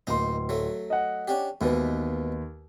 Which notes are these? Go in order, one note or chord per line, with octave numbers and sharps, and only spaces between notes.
D1 A#3 D#4 C6
F#3 A3
D#5 F#5
C#4 D4 G4
D#2 G#2 B2 E3 B4